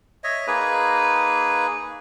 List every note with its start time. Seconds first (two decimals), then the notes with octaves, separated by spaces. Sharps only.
0.24 C#5 D#5 E5
0.47 A#3 D#4 G#4 B4